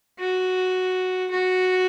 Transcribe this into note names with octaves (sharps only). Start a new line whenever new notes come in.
F#4
F#4